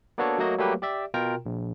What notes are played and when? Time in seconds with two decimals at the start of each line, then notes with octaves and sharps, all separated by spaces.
0.18 A#3 B3 D4 F#4 A4 C#5
0.38 F#3 A3 A#3 F#4 D#5
0.58 F#3 G3 A3 A#3 G4 B4
0.82 G4 D5 E5
1.14 B2 F4 A#4 G5 A#5
1.46 A#1